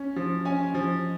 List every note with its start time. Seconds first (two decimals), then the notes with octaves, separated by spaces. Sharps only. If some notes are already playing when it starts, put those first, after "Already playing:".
Already playing: C#4
0.16 F3
0.45 C#4 G#5
0.74 F3